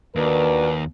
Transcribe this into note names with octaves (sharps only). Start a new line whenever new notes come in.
D#2 D4 F#4 A#4 B4